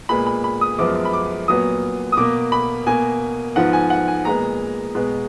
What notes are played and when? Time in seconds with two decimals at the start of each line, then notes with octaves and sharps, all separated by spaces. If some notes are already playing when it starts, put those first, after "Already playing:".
0.09 A#2 G#3 B3 B5
0.27 B5
0.44 B5
0.61 D#6
0.78 F#2 F3 G#3 B3 D6
1.05 B5
1.13 D6
1.48 A#2 F#3 B3 D#6
2.12 D#6
2.17 B2 A#3 D6
2.52 B5
2.87 B2 A#3 G#5
3.56 G#2 F3 B3 F#5
3.73 G#5
3.90 F#5
4.08 G#5
4.25 A#2 G#3 B3 A#5
4.95 B2 G#3 B3